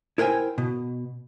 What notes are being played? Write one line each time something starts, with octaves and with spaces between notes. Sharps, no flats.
E4 A#4 C5 G5 G#5
B2